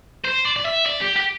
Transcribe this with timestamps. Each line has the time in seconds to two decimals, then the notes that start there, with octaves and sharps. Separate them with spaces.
0.25 C5
0.45 D5
0.56 D5
0.65 E5
0.86 D5
1.01 G4
1.16 G4